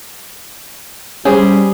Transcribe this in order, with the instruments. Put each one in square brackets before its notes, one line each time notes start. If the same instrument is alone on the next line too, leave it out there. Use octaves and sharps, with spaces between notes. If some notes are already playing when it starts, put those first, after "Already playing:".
[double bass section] G3 [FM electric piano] C#4 [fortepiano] G4 G#4 C5